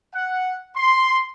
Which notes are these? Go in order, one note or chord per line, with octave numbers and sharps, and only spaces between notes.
F#5
C6